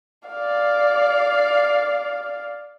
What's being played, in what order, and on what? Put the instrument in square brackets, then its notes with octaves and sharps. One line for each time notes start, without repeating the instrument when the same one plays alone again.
[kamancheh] D5 F5